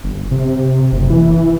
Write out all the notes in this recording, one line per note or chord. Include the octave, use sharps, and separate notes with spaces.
G1
C3
F#1
E3